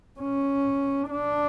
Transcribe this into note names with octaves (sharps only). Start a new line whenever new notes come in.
C#4
D4